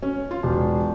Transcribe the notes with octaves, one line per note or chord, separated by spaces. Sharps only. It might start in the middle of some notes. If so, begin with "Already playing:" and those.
C#4
F4
E1